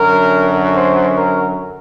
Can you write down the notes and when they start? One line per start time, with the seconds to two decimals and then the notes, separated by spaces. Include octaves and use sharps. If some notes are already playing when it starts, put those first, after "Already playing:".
Already playing: F#2 D3 F#3 A#4
0.75 C5
1.17 A#4